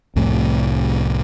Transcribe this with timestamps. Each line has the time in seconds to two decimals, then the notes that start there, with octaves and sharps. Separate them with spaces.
0.16 C2 F2 A2 C3